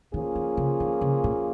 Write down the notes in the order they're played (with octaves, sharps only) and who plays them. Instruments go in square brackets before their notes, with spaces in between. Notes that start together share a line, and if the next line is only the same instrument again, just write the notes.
[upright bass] D#3 [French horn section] F3 A#3 C#4 F4 G#4
[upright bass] D#3
C#3
D#3
C#3
A#2